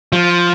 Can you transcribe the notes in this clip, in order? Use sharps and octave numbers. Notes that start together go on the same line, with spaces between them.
F3